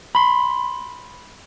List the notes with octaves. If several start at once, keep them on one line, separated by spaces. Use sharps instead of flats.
B5 C6